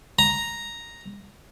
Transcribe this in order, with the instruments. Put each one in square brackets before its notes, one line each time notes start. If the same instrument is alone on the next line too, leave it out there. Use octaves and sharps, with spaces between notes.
[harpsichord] A#5